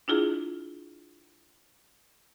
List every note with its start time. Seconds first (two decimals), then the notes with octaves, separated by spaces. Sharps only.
0.08 D4 E4 F4 G#4